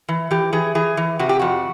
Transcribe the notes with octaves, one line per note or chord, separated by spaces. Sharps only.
E3
E3 G4
E3 G#4
E3 G#4
E3
C3 F#4
G4
F2 F#4